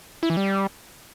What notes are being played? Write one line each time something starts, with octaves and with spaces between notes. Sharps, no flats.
E4
E3
G3